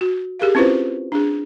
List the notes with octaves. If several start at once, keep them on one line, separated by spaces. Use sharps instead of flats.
F#4
G4 G#4 A#4 F5
C4 C#4 E4 F4 B4 C5
D4 G#4